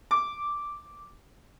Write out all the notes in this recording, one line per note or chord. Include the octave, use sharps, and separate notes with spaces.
D6